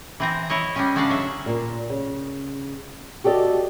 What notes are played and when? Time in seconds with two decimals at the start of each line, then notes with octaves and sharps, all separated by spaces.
0.20 E3 C4 A#5
0.50 E4 C#5 D#5
0.76 G3 G#3 C#4
0.95 C#3 G#3 C#4 D4 F5 F#5
1.10 F#3 E5
1.46 A#2
1.90 C#3
3.24 F#4 G4 A4 D5 D#5